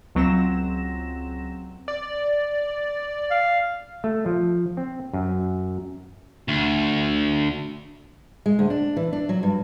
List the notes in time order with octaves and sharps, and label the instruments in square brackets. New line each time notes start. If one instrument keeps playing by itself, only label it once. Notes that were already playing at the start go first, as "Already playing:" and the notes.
[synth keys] C#2 F#3 C4 A#6 E7
[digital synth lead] D5
[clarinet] F5
[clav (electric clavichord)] A3
F3
C4
F#2
[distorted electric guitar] D2
[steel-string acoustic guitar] G#3
D2
D4
E3
D4
F#3
G2